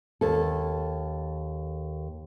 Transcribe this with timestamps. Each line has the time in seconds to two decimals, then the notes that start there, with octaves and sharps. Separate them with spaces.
0.21 D#2 A4